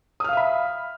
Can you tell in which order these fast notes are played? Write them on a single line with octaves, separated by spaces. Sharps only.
D#6 F6 F5 E5 B5